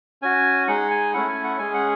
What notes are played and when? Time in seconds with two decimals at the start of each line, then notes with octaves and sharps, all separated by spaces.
0.22 C#4 F#4 G#5
0.68 G#3 D#4 G#4 F#5
0.90 G#5
1.14 A3 C#4 E4 F#5
1.28 G#5
1.44 F#5
1.59 G#3 C#4 G#4 G#5
1.74 F#5